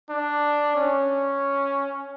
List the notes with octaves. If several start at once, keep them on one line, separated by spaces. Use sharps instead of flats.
D4
C#4